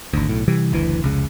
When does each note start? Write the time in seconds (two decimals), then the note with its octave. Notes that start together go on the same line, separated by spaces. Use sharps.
0.13 G#1 D2
0.29 B1 A2
0.48 C3 E3 G3
0.72 F#1 D2 E3
1.02 F1 C#2 C#3